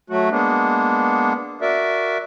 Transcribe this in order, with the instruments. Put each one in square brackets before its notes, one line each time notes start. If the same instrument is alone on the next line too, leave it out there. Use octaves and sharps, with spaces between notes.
[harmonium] F#3 A3 F#4
G#3 A#3 B3 D4
F#4 A#4 D5 E5